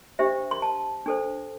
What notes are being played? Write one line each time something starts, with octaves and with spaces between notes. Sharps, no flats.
D4 G4 C5 E5
C6
A5
D4 A4 C5